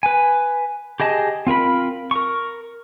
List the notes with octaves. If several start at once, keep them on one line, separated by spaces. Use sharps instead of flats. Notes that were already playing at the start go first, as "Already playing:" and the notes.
B4 G#5
G4 G#4 D#5 A5
C4 F4 A#4 B5
A#4 C#6